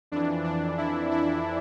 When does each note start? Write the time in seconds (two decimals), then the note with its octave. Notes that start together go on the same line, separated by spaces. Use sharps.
0.12 F2 E3 D4
0.44 D4
0.78 E4
1.11 E4